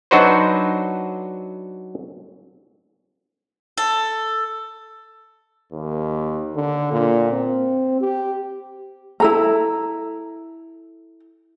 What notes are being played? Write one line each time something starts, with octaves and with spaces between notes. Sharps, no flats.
F#3 D4 D#4 F#4 B4 C5
A4
D#2
D3
A#2
C4
G4
E4 A4 A#5